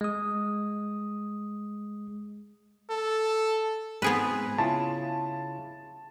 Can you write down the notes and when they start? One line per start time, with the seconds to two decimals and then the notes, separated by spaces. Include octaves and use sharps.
0.01 G#3 D#6
2.90 A4
4.02 G#2 B3 C4 G#4 B4
4.58 C#3 E4 F4 A5